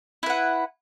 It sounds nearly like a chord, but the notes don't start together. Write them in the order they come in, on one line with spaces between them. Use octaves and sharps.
E4 B4 F#5